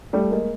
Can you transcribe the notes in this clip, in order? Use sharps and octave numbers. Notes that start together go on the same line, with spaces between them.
G3 A3
G#3 A#3